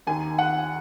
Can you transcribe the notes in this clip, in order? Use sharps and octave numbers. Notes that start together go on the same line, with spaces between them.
D#2 D#3 G#5
F#5